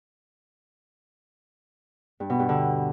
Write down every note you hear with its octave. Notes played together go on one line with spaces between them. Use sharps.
G2
B2
G2
D3